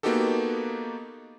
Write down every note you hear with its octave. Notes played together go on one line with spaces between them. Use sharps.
A#3 B3 D#4 F#4 G4 A4